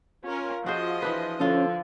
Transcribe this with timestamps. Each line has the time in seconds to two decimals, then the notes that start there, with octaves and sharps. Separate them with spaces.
0.24 C#4 F4 A#4
0.66 F3 F#4 G#4 C5 D#5
1.02 E3 D4 B4
1.40 D3 F3 C#4 F4 A4